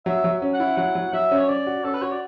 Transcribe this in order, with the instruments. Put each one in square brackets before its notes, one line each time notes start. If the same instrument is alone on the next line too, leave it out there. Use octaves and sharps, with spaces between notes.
[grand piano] F#3 [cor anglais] E5
[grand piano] F#3
C#4
[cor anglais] F#5
[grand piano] E4
[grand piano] F#3 [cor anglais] F#5
[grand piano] F#3
[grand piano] F#3 [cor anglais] E5
[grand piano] C#4
[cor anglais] C#5
[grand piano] C#4 [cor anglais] D5
[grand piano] F#4
[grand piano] C#4 [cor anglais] A4
[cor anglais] B4
[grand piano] F#4 [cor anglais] C#5
[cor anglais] D5